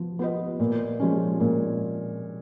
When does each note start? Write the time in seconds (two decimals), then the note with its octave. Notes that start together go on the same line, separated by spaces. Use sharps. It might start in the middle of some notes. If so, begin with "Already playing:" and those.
Already playing: F3 B3
0.19 B3 F4 B4 D#5
0.60 A#2
1.00 F3 G#3 C#4
1.40 A#2